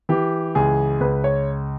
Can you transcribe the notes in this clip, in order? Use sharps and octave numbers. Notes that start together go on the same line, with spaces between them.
E3 G4
C#2 G#4
C#2 B4
C#5